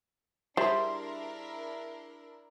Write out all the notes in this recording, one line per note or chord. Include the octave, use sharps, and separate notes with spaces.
G3 D4 E4 G#4 A#4 C5 E5 C6